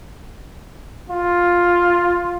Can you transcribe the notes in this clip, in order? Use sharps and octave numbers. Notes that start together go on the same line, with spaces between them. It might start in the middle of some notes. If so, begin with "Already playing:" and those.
F4